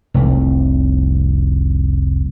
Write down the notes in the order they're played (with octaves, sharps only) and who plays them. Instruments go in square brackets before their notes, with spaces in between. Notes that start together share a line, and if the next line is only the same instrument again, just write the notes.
[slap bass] F1 C2